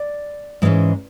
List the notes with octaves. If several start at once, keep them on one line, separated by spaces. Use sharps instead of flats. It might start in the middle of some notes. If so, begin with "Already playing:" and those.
Already playing: D5
G#2 E3 G#3 C#4